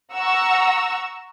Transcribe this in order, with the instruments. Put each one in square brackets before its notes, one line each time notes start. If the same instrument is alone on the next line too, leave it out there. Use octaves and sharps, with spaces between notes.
[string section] F#5 A#5 C#6 E6